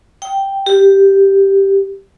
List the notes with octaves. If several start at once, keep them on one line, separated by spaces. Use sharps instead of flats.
G5
G4